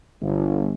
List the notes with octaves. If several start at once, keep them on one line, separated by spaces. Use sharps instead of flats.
G1